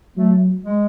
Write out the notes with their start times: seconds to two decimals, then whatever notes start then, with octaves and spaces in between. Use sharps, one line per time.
0.17 F#3 A3
0.64 G#3